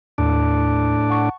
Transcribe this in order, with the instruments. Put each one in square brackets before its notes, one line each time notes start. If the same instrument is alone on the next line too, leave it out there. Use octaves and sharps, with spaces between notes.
[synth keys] D#2 [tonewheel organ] A2 D4
[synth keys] F#5 A5 C#6